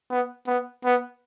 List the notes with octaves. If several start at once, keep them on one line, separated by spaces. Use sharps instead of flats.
B3
B3
B3